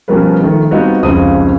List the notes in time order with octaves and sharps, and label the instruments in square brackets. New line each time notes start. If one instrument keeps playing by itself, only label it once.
[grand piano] B2 F3 G3 C#4 A#4 B4
D#3 F3 A3
G3 B3 C4 D#4 F4 F#4
F1 C#2 C#3 C5 D#6